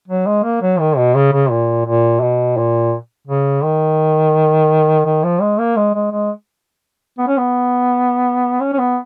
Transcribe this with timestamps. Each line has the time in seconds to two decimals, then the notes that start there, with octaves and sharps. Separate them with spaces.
0.08 F#3
0.26 G#3
0.43 A#3
0.62 F#3
0.79 D#3
0.97 B2
1.15 C#3
1.33 C#3
1.51 A#2
1.86 A#2
2.21 B2
2.57 A#2
3.27 C#3
3.63 D#3
5.05 D#3
5.23 F3
5.41 G#3
5.59 A#3
5.76 G#3
5.94 G#3
6.12 G#3
7.18 B3
7.27 C#4
7.37 B3
8.60 C#4
8.73 C#4
8.78 B3